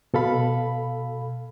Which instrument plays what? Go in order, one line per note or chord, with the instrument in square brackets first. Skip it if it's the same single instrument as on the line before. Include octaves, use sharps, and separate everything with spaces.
[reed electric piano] B2 A4 F5 B5